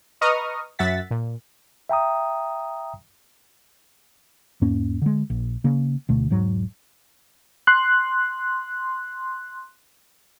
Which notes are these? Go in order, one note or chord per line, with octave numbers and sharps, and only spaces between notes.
B4 D#5 A#5 C#6 D#6 F6
F#2 E5 F#5 A6 B6
A#2
E5 G5 A#5 D#6
E2 G#2 A#3 C#4
D3 G#3
A#1
C#3 A#3
D2 B2 A3
E1 G#2 F#3
C6 F#6